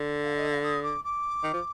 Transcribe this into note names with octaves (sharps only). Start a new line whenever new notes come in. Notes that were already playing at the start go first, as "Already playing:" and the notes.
Already playing: D3
F5
D#5
F5
D#6
D6
D6
D#3
F3